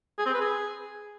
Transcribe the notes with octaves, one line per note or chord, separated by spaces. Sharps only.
G#4
C4
B4
G#4